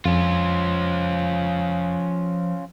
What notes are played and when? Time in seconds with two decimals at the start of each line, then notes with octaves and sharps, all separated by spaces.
0.05 F2 F3 C#4 F4